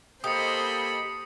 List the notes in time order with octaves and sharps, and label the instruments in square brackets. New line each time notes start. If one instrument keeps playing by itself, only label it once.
[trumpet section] A#3 A4 D#5 [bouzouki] G4 [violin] C5 B5 [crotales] D#6 C#7